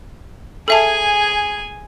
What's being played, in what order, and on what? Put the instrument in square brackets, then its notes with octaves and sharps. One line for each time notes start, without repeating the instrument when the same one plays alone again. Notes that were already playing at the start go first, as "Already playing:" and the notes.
[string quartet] G#4 G#5 [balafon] A4 E5 A5